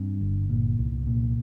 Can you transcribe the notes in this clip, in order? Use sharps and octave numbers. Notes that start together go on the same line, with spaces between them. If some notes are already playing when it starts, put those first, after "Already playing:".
Already playing: G2 C4
G1
A#2
C2
A#2